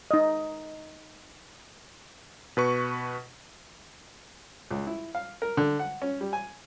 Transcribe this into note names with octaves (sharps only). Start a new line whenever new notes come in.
D#4 D#5
B2 B4 C#6
C#2
E4
F5
A#4
D3
F#5
C#4
G3
G#5